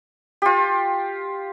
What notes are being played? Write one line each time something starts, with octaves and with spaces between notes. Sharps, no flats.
F4 G4